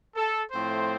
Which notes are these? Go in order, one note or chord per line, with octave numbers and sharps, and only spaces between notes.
A4
A2 F3 A3 C4 C5